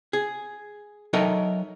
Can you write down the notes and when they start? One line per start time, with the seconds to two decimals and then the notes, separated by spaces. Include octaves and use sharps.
0.13 G#4
1.13 F#3 D#4 A4 A#4 D#5 E5